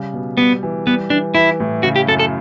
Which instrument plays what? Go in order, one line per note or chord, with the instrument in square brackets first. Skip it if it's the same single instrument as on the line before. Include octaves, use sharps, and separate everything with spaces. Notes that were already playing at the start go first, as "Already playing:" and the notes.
Already playing: [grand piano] C#3 G3
B2
[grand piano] G3 [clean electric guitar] B3
[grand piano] E3
[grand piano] G3 [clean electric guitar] B3
[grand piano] E3 [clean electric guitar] D4
[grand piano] E3 [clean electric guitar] E4
[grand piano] A2
[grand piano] C#3 [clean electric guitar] F#4
[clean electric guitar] G4
[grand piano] F#2 [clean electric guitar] A4
[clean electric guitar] A4